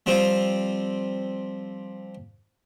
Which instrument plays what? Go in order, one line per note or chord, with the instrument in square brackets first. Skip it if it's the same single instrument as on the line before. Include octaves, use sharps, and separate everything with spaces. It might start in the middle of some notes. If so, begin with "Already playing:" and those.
[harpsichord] F3 G3 C4 F4